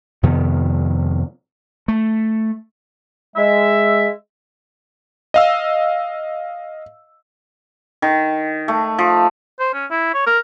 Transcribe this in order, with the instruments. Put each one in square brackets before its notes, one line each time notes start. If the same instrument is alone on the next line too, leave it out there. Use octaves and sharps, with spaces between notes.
[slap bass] F2 C3 D#3 B3
A3
[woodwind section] G#3 E5
[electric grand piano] D#5 F5 E6
[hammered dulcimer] D#3
A3
F3
[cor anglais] C5
C#4
E4
C#5
A#4